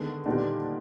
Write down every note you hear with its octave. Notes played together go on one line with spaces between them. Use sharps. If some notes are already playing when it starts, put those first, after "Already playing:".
Already playing: D3 D#3 G#3 B3
A#2 D#3 G3 B3 D4